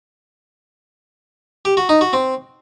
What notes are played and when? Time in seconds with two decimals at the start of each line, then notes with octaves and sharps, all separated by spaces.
1.65 G4
1.77 F#4
1.89 D#4
2.01 F#4
2.13 C4